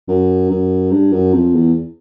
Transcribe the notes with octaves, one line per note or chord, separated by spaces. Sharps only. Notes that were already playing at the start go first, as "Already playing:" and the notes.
F#2
F#2
G2
F#2
F2
E2